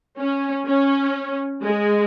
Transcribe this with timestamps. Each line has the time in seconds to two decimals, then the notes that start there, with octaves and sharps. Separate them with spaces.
0.18 C#4
0.66 C#4
1.62 G#3